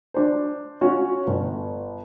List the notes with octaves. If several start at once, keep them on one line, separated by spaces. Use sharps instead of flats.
D4 C5
C#4 F4 F#4 C#5
G1